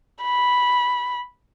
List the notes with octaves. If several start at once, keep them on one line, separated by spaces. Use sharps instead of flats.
B5